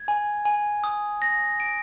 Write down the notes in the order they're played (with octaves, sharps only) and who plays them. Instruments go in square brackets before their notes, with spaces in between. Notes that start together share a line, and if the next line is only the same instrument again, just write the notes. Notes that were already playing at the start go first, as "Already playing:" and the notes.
Already playing: [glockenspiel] G#6
G#5
G#5
D#6
A#6
D7